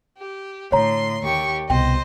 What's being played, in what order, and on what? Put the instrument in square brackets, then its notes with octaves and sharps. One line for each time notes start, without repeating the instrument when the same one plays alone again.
[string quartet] G4
[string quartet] A2 C6 [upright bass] D3 [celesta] C#5 A#5
[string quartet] D#2 G4 C#6
[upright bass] C2 B2 [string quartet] C5 D#5 [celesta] G5